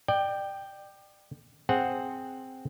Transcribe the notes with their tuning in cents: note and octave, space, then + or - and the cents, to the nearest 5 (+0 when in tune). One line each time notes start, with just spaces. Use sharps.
D5 +30 G5 +0
C4 +0 G#4 +0 F#5 +0